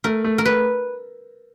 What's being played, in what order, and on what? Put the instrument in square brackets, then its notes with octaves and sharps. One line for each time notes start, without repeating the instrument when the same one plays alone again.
[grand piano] A3 [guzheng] A#4
[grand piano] A3
[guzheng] A#4
[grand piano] A3 [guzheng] B4